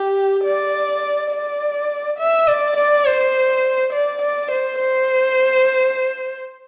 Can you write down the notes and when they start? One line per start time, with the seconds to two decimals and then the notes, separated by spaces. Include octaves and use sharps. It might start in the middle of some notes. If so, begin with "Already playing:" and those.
Already playing: G4
0.44 D5
1.31 D5
2.19 E5
2.47 D5
2.77 D5
3.05 C5
3.93 D5
4.21 D5
4.51 C5
4.79 C5